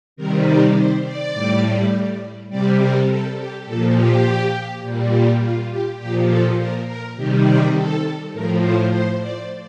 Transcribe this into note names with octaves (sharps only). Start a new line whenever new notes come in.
C3 D#3 G3 A#4
D5
C5
D5
A2 G3
C3 G3 D5
A#4
A4
G4
A#2 F3 A4
G4
A#2 G3
F4
G4
A#2 F3 G4
A4
A#4
A#4
C3 D#3 G3 G4
G4
A4
A2 F3 A#4
C5
C5
D5